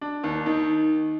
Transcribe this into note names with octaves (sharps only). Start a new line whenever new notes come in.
D4
D#2
D#3